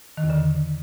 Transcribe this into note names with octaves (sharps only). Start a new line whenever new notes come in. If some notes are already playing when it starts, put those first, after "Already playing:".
D#3
E2
D3